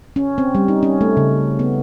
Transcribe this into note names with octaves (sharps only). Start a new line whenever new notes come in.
C#4
C4
G3
D#4
C#4
A3
C#3
B3